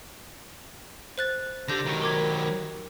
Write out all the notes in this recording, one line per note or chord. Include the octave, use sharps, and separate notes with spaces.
C5 F#6 A6
D3 G4 G6 A#6
D#3 F#3
A#4 D6 G#6